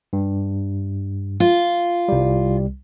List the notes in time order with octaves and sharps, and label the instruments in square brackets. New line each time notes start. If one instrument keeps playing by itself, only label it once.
[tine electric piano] G2
[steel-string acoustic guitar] F4
[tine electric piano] C2 G3